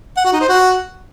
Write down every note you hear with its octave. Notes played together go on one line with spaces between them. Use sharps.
F#5
F#4
D#4
C5
F#4